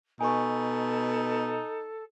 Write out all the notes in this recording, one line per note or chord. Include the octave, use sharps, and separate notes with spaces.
B2 D#4 A4 G#5 C#6